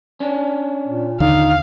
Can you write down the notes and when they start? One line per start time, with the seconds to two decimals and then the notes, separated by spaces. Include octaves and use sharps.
0.20 C#4 D4
0.87 A#2
1.20 D#2 D3 D#4 F5